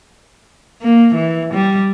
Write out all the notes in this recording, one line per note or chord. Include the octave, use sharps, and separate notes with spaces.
A#3
E3
G3